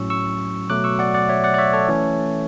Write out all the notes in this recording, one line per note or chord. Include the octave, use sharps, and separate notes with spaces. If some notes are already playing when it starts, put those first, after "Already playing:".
Already playing: A2 F#3 C#4 C#6 E6
C#6 E6
B2 F#3 A3 D6 F#6
C#6 E6
D5 F#5
D5 F#5
C#5 E5
D5 F#5
D5
C#5 E5
A4 C#5
E3 A3 C#4